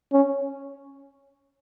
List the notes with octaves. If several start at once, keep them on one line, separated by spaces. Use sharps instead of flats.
C#4